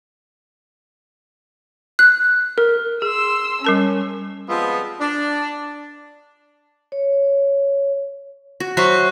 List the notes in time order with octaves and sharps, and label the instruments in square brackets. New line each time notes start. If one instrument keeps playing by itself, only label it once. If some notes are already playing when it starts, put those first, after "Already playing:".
[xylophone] F#6
A#4
[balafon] G#4 [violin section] C6 E6
[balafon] G3 A#4 A5 [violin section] C#4
[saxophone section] F3 G3 G#3 B3 C4 F4
D4
[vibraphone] C#5
[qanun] F#4
[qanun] F#3 C5 E5 [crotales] C#6 F#6